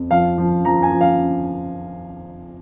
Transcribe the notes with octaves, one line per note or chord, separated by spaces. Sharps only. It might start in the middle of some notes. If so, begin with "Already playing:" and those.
Already playing: F2
F3 F5
F3
F3 A#5
G#5
F3
F5